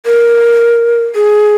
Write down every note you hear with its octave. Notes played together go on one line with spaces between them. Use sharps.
A#4
G#4